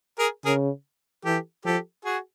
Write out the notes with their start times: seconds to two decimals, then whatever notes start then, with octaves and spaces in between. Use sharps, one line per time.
0.19 G#4 A#4
0.45 C#3 G#4 A#4
1.25 E3 G4 A4
1.65 F3 G4 A4
2.05 F#4 G#4